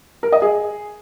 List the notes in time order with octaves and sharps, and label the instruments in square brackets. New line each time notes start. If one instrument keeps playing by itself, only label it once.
[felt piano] A#4
D#5
G#4